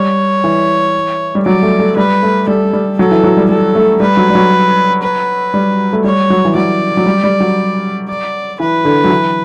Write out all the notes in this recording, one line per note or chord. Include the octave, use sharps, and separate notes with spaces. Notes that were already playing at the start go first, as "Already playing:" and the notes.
Already playing: G3 C#5
E3
G3
F#3 D5
A3
A3
G3 B4
A3
G3 A4
G3
F#3 A4
E3
F#3
G3
G3 A4
A3
G3 B4
F#3
G3
F#3
B4
G3
A3
G3 C#5
F#3
E3
F#3 D5
F#3
G3
G3
F#3
D5
E3 B4
D3
F#3
E3